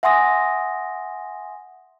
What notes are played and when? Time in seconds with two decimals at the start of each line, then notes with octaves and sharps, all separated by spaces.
0.03 E5 F#5 G#5 C6 D#6 A#6